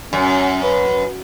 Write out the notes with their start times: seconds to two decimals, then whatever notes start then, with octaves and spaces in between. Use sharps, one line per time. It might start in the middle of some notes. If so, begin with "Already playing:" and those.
0.13 F#2 C#4
0.63 B4